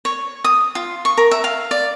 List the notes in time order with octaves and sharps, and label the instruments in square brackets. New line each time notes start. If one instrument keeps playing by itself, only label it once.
[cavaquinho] C#5
D#6
F4
C#6
A#4
E5
F5
D5